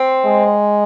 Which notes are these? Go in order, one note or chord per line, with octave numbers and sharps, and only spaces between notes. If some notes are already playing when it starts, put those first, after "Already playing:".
Already playing: C4
G#3